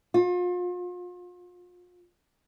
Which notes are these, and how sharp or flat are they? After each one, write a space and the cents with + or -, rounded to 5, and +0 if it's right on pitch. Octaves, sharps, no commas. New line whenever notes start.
F4 +35